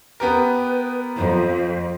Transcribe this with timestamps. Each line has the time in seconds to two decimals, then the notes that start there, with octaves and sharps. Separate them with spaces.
0.20 B3 G4 A#4 B4
1.17 F2 C5